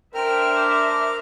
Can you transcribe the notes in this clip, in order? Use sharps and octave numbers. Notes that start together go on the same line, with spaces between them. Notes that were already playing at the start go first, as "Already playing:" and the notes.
D4 A#4 C5 E5 G5 F6
D6